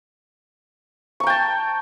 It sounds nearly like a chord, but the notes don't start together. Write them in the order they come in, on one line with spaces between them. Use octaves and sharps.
C#6 A#5 G5 A5